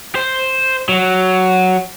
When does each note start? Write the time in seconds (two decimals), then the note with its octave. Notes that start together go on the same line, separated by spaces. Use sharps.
0.15 C5
0.89 F#3